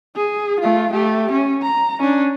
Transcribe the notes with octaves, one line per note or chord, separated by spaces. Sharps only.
G#4
A3 F4
A3 G4
C#4
A#5
C#4 D4